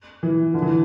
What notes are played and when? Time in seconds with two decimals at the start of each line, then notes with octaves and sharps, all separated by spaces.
0.23 E3
0.54 D3
0.62 E3